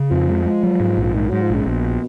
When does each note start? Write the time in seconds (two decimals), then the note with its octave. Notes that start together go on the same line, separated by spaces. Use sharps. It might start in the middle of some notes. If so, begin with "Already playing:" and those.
Already playing: C#3
0.11 F2 F3
0.29 G#3
0.46 G#3
0.63 F#3
0.80 G#2
0.98 A#1
1.03 F3
1.14 G#2 D#3
1.29 G#2 F#3
1.42 F3
1.50 A#1 C#3
1.66 A#1 B2